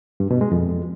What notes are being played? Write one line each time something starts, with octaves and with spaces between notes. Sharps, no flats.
G2
B2
G#3
F2